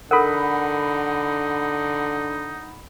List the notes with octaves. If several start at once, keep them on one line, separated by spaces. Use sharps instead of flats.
D3 D#4 A4 A#4 F#5 B5